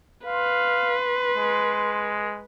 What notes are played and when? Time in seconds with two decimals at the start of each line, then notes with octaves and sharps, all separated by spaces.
0.26 B4 F5 C6
1.36 G#3